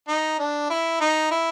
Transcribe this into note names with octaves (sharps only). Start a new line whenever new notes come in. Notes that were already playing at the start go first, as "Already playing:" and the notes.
D#4
D4
E4
D#4
E4